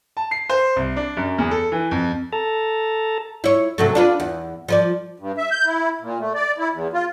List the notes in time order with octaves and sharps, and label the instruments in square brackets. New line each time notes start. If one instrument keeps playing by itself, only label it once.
[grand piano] A5
C7
C5
C2
D4
F#2
E2
A4
E3
F2
[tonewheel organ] A4 A5 A#5
[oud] E4 C#5
C3 F#3 A3
D4 F4 B4
E2
F3 B4 D5
[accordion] G2
E5
G6
E4
A#2
A3
D5
E4
E2
F4